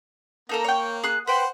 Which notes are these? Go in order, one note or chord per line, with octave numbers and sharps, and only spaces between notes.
A#3 D#4 A4 A#4
C#5 G5
G#4 F#6
B4 C5 F#5 G5 C6